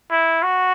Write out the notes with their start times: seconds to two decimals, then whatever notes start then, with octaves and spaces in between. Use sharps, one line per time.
0.11 E4
0.43 F#4